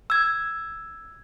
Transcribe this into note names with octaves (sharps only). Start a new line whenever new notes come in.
E6 G#6